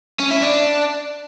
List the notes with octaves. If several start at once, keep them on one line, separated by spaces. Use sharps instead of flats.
C#4
E4
D4